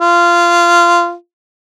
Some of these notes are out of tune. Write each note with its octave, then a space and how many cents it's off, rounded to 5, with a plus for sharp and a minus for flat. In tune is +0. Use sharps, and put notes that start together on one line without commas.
F4 -15